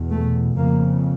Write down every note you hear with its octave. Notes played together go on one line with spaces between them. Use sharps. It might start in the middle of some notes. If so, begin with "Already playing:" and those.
Already playing: E2 B2
A3
F2 C#3 A#3